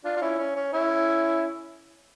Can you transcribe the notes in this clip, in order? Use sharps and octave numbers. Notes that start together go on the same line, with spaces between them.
D4 F4
F4
C#4 E4
C#4
C#4
C#4 E4